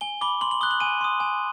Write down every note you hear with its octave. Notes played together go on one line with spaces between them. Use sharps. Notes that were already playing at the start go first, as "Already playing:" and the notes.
G#5 G7
B5 D6 G7
C6 F#7
F#7
D#6 F#6 G7
F#7
G#5 D#7
C6 D#6
G#5